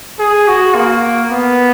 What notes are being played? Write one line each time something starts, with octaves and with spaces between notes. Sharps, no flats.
G#4
F#4
A#3
B3